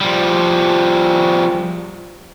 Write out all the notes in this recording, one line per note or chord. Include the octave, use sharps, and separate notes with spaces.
F3 G3